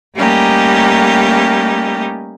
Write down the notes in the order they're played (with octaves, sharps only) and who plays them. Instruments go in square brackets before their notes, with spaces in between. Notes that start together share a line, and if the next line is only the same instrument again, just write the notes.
[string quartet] G3 A3 A#3 C#4 D#4 G4